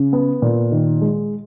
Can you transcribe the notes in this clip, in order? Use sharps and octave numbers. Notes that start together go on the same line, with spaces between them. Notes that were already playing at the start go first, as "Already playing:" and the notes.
Already playing: C#3
B3
A#2
D#3
G#3